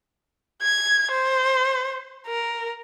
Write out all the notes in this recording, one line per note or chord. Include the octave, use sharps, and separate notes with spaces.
G#6
C5
A#4